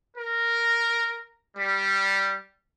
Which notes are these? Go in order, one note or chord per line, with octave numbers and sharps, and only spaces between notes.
A#4
G3